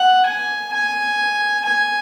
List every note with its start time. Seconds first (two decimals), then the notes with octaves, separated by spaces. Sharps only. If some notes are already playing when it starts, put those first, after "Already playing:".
Already playing: F#5
0.26 G#5
0.73 G#5
1.66 G#5